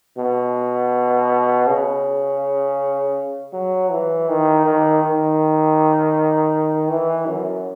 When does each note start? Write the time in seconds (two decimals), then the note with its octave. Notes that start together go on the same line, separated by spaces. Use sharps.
0.18 B2
1.67 C#3
3.53 F#3
3.91 E3
4.29 D#3
4.66 D#3
5.03 D#3
6.89 E3
7.27 F#2